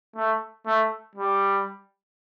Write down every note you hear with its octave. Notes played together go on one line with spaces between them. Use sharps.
A3
A3
G3